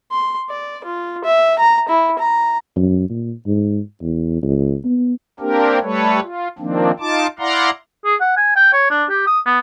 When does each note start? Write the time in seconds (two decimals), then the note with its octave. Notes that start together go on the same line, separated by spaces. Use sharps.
0.12 C6
0.49 D5
0.85 F4
1.24 E5
1.59 A#5
1.89 E4
2.19 A#5
2.76 F#2
3.10 A#2
3.46 G#2
4.02 E2
4.43 C#2
4.85 B3
5.40 A#3 C4 D4 G4 A#4
5.83 G3 A3 A4 B4 C#5
6.22 F4
6.59 D#3 F3 A#3 C4 D4
7.00 D#4 F4 A5 D6
7.39 E4 D5 F5 F#5 A#5 C6
8.05 G#4
8.21 F#5
8.37 G#5
8.56 G5
8.73 C#5
8.91 D4
9.09 G4
9.27 D#6
9.46 B3